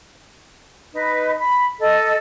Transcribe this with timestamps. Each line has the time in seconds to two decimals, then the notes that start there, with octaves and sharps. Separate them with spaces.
0.93 D#4 B4
1.40 B5
1.80 A4 D#5